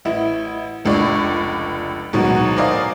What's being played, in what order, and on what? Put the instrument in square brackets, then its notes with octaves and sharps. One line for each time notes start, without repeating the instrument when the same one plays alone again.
[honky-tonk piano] A1 E4
F1 C#2 D4 D5 C#6
D2 G#2 B2 D#3 F#3 G#3
A#4 C5 D5 D#5 F5 G#5